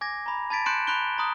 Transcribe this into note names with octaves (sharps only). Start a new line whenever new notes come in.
G#5 D6 G#6 A#6
A#5 B5
A5 B5 G#6 A6 B6 D7
C6 F#6 G6 C#7 D7 E7
B5 C6 F#6 G6 D7 G7
A#5 C6 D#6 F#6